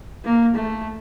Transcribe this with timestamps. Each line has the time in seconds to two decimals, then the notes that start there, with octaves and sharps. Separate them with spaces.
0.25 A#3
0.55 A3